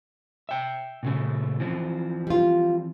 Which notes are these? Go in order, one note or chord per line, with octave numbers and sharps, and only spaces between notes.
E5 G5
A#2 C#3 A3
E3 F3 C4
G3 F4